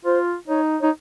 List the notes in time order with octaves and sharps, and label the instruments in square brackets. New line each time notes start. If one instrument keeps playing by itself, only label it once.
[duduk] F4 [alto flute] C5
[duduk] D#4 [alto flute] C#5
[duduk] D#4 [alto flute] C#5